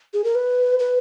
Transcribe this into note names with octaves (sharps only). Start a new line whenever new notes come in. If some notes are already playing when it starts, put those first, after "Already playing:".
G#4
A#4
B4
B4